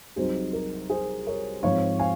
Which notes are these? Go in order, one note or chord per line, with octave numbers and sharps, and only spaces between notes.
C2 C3 F#3 C4 D#4 G#4 C5
A#4
G#4 C5
A#4 C#5
G#2 F3 C4 C#5 F5
F5 G#5